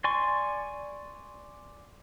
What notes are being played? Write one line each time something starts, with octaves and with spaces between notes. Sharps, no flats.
D5 G#5 C6 C#6